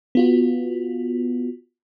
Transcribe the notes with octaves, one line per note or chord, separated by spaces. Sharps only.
B3 F4 F#4